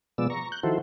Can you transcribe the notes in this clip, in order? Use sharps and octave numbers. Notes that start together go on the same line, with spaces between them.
B2 F3 G#3 B3 D5 E6
A#5 C#6
F#6 G6
D#3 F3 E4 F#4 A4 C5